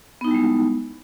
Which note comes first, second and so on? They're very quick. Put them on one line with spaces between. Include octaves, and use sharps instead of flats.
B3 D#4 E4 G3 G#3